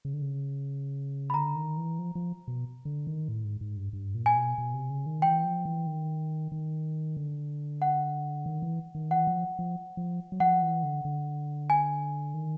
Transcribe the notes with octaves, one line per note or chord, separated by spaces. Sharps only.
C#3
D3
C#3
B5
D3 A#5
D#3
E3
F3
F3
B2
D3
D#3
A2
G#2
G#2
G2
G2
A#2
G#5
B2
B2
C3
C#3
D#3
E3 G5
F3
E3
D#3
D#3
D3
F#5
D#3
E3
D#3
E3 F#5
F3
F3
F3
F#3
F3 F#5
E3
D3
D3
G#5
D#3